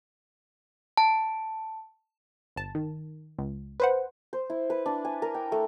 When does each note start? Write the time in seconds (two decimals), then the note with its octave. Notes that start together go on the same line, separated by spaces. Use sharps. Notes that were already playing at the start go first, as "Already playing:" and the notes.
0.97 A5
2.56 G1 A5
2.75 D#3
3.39 C#2
3.80 B4 C5 F#5
4.33 C5
4.50 E4
4.70 B4
4.86 D4
5.05 G#5
5.22 A#4
5.35 G5
5.52 A3